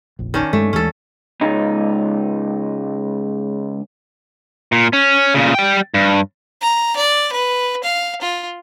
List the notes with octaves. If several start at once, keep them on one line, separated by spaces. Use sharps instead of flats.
F1 A#1
D#3 C#4 D4
G2 G#3 A3
D#2 E3 G#3 C#4 A4
C#2 G#3 D#4
A#2
C#4
A#2 C#3
G3 G5
G2
A#5
D5
B4
F5
F4